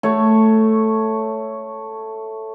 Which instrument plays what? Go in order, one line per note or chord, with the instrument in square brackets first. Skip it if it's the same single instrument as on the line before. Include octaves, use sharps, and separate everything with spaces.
[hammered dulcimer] A3 C#5